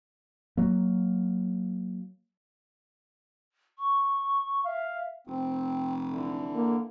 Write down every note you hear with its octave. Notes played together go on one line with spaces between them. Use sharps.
F#3 A#3
C#6
E5 F5
F1 C4
D3 E3
A#3